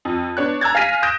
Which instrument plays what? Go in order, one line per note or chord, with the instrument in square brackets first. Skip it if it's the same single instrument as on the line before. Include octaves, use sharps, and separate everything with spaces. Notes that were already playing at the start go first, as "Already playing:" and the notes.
[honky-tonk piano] F2
B3 D4 C#5 F#6
A#5 E6 F#6 G#6 A6
F5 G#5 F6 A#6 B6 D#7
D#6 F#6 G6 A#6 D7 E7